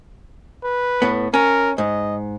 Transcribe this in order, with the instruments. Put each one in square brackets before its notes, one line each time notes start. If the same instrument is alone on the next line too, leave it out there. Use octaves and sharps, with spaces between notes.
[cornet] B4
[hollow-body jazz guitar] A2 B3
[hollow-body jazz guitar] C#4 [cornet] A#4
[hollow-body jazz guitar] G#2 [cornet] D#5